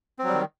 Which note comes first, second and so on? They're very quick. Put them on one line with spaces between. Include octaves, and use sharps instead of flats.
C4 F#3 G3 D#3